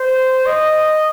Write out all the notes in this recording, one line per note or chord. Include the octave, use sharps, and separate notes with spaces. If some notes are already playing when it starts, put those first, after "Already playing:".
Already playing: C5
D#5